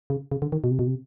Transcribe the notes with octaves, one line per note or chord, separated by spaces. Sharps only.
C#3
C#3
D3
D#3
B2
C3
B2
C3